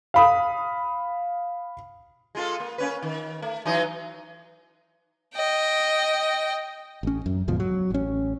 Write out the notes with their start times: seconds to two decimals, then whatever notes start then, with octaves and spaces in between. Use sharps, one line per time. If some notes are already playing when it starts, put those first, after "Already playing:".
0.14 F5 B5 D#6
2.35 G#3 F4 A4
2.60 A#3
2.78 A#3 C#4 B4
3.02 D#3
3.42 A3
3.65 E3 F#3 D#4
5.35 D#5 G5
7.03 A1 C#4
7.26 F#2
7.48 D2 G#2 B2 F3
7.60 F#3
7.90 A1 C#4